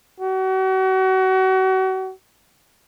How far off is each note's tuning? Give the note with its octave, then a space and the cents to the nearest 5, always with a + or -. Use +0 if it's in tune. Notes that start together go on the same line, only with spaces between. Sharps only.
F#4 +35